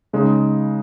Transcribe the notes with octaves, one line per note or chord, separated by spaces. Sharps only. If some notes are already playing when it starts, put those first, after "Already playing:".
C#3 G#3 D#4